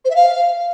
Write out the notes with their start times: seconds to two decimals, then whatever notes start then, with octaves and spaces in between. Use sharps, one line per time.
0.05 C5
0.10 E5
0.15 F5